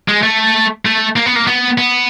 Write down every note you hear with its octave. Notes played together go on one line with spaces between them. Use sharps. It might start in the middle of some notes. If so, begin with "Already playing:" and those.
G#3
A3
A3
A#3
B3
A#3
B3
B3